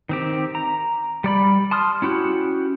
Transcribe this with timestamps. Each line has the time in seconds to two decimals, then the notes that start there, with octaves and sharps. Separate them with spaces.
0.09 D#3 C4 G4
0.55 A#5
1.24 G3 D5 B5
1.71 A5 C6 D#6 F6
2.02 C#4 E4 F#4 G4